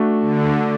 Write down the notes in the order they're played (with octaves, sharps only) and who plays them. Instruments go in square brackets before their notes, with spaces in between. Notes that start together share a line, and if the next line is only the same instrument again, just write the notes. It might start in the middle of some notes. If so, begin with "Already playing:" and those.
Already playing: [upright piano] A3 D4 F#4
[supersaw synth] D3